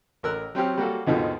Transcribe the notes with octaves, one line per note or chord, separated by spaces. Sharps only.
A1 A#4 E6 F#6
F#3 C4 C#4 G4 F6
G3 A#3 F#4 A4
D#2 G#2 B2 D3 D#3 F3